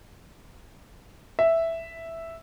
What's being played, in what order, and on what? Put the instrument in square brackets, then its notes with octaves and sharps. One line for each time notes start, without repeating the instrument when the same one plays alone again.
[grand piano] E5